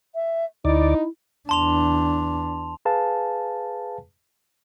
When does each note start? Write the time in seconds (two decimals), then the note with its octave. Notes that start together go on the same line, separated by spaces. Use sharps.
0.15 E5
0.65 D2 D#4 E4 D5
1.49 E2 D4 A5 C6 F7
2.85 G#4 B4 F5 G#5 A5